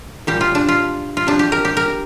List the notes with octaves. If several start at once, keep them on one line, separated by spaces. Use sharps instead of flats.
A#2 G3 G4
F4
D4
F4
F4
C3 F3 D4
G4
A#4
G4
A#4